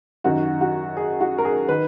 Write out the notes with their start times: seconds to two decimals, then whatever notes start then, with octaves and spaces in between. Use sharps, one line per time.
0.24 F#2 D#3 F#4
0.61 F#4
0.97 G#4
1.21 F#4
1.38 A#4
1.45 G#4
1.69 D#3 B4